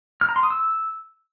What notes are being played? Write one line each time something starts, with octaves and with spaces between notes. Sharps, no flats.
F6
A#5
C6
D#6
E6